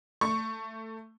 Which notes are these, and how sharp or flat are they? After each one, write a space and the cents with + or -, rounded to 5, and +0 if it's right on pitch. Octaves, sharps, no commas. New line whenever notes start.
A3 +15 C#6 +0